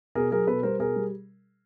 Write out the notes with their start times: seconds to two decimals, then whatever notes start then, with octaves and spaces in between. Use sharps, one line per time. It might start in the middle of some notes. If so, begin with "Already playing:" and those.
0.15 B2 G#4 A#4
0.32 F#3 G#4 A#4
0.47 B2 A4 B4
0.63 G3 A#4 C5
0.79 B2 G#4 A#4
0.96 G3